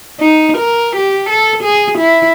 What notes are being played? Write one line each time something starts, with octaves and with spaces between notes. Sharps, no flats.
D#4
A#4
G4
A4
G#4
E4